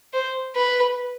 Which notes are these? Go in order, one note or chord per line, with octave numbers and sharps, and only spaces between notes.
C5
B4